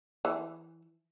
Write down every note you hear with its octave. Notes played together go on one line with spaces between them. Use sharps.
E3